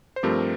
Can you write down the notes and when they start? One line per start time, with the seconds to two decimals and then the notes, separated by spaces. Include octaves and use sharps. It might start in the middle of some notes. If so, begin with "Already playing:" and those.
0.16 C5
0.23 G2 F3 A3 C4 G4 A#4